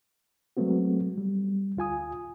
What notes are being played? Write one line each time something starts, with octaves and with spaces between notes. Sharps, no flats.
F#3 G#3 A3 B3 C4 F#4
G3
D2 F4 G#5 D#6